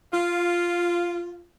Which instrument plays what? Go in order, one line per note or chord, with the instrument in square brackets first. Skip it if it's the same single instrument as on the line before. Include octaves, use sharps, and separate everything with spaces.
[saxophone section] F4